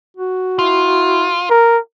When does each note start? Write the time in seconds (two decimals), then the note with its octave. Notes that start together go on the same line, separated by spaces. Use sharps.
0.17 F#4
0.59 E4 F4
1.50 A#4